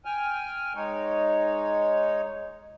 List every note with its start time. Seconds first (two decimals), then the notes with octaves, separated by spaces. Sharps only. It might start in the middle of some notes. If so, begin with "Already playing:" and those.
0.05 G5 G#5 F6
0.75 G#3 D#4 C#5